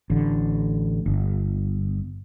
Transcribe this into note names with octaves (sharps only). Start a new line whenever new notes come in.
A1 D3
G1